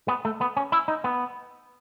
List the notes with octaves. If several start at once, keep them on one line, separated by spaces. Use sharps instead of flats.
B3
A3
B3
C#4
E4
D#4
B3